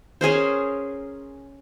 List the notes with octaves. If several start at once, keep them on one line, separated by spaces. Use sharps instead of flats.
C#4 G#4 A#4 C5